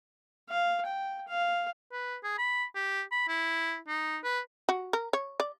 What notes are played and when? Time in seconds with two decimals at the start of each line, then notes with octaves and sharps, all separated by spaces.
0.49 F5
0.85 G5
1.28 F5
1.92 B4
2.24 G#4
2.38 B5
2.75 G4
3.12 B5
3.28 E4
3.88 D#4
4.24 B4
4.69 F#4
4.93 A#4
5.13 C#5
5.40 D5